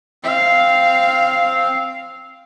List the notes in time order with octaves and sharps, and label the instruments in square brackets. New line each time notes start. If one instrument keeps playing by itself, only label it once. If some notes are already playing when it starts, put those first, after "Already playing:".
[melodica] C4 [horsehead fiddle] F5